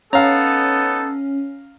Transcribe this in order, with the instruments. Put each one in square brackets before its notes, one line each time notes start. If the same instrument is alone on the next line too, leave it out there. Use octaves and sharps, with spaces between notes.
[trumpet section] B3 D#4 A4 [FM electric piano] C#4 [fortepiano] F5 A#5